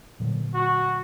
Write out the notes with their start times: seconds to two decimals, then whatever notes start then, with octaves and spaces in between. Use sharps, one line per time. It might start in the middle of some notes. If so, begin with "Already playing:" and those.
0.20 A#2 D3 F#3
0.54 F#4